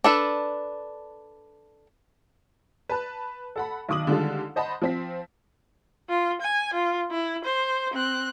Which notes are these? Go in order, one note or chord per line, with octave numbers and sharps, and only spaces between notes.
D4 A4 B4
B4 A5 F#6
A4 F#5 B5
B1 D#3 D6 D#6 F#7
D3 D#3 G3 G#3 F4 A4
C5 D#5 F#5 A5 B5
F3 C4 B6
F4
G#5
F4
E4
C5
C4 F#6